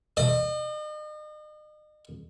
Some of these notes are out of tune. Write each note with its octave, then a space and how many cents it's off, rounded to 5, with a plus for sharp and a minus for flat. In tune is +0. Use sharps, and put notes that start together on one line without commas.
D#5 -40